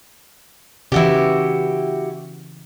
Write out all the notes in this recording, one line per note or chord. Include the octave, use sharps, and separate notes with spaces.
C#3 E3 E4 F#4 G4